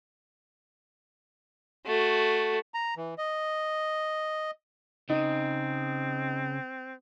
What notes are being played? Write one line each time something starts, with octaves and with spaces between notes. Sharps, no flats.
A3 F#4
A#5
E3
D#5
C#3 C4 D#4